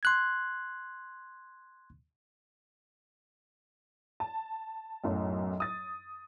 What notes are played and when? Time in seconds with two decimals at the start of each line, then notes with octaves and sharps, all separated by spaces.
0.03 C6 F#6 G#6
4.20 A5
5.04 B1 F#2 A2
5.60 D#6 A6